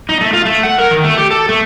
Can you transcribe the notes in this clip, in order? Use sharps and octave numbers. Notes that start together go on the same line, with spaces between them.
D#4
A3
F4
A3
F#5
A#4
D#3
A3
G4
A4
A3